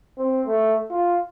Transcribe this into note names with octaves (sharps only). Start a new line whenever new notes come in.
C4
A3
F4